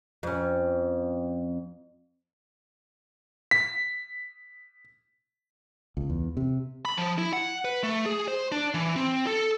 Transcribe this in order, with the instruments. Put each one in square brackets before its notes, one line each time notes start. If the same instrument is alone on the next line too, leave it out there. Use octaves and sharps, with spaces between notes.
[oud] F2 C#4
[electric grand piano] B6
[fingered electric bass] C#2
E2
C3
[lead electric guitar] B5
F3
E4
F#5
B4
A3
G#4
C5
D4
E3
C4
A4